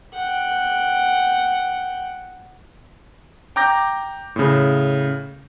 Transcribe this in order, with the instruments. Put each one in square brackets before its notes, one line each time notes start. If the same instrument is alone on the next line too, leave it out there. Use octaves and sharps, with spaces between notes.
[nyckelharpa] F#5 G5
[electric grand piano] G5 A#5 D6 G6 A#6
A2 C#3